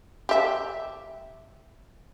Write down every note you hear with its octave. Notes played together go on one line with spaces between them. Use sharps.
G4 E5